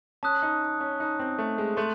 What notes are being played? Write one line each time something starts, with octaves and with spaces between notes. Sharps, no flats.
C#4 A5 D#6 F#6
D#4
C#4
D#4 A5 D#6 F#6
C4
A3
G#3
A3 C6 F#6 A6 D#7 F#7